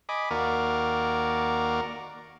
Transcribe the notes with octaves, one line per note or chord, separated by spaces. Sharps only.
D#5 G#5 B5 D6
D#2 A#3 F#4 A#4 D5